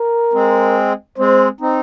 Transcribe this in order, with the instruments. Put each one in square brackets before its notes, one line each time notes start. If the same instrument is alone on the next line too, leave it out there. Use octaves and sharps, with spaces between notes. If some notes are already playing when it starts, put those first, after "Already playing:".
Already playing: [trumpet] A#4
[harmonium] G#3 C4
[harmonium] G#3 C4 [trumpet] C5
[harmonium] C4 D#4